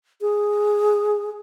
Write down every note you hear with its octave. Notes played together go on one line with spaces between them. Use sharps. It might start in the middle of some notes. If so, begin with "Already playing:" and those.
G#4